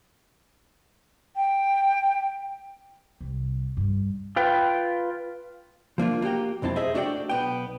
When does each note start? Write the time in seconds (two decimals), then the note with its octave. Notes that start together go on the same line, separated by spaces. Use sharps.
1.36 G5
3.21 C2
3.77 G2
4.36 F4 B4 G5
5.98 F3 A#3 D4 F4
6.22 A#3 F#4 G4 G5
6.62 B1 F2 C4 E4 A5
6.76 G#4 C5 D#5 E5
6.94 A3 D4 F#4 A4 D5 G5
7.29 B1 B3 G5